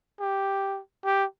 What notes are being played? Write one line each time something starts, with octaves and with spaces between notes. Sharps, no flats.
G4
G4